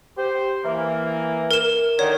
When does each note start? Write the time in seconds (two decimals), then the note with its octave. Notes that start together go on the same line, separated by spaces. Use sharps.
0.17 G4 C5
0.65 E3 A#3
1.51 A#4 E7
1.99 D3 D#3 C#5